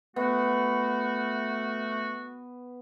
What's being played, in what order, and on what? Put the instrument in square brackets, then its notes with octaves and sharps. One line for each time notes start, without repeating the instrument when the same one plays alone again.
[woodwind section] A3 F#4 [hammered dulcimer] B3